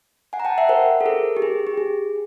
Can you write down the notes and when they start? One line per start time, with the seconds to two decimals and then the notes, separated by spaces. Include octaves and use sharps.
0.33 F#5 G#5
0.40 A#5
0.45 G5 A5
0.58 E5 F#5
0.69 A#4 C5
1.01 A4
1.05 G#4 A#4
1.37 G4
1.42 G#4
1.67 G4
1.78 G#4